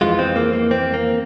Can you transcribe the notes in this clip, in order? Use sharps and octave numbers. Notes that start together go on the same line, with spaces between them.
F2 E3 G#3 F4
C4
A#3
A#3
C4
A#3